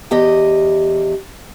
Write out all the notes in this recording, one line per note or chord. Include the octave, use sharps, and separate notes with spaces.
E2 G4 D#5